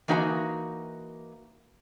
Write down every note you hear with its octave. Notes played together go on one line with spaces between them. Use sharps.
E3 A#3 D#4 F#4 E5 A#5